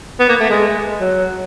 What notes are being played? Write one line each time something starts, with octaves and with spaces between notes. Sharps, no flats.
B3
A#3
A3
G#3
F#3